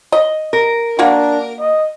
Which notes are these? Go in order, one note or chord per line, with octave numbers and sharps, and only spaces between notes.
D#5
A#4
A#3 D4 F#4
D#5